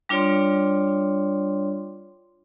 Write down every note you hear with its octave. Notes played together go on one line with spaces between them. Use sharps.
G3 D4 F4 C#5 D5 C6